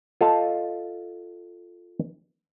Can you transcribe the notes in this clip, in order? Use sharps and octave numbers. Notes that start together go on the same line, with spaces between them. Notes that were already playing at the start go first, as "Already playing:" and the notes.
F4 A4 D#5 F5 A5